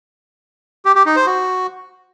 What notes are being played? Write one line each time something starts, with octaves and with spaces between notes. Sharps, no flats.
G4
G4
D#4
C5
F#4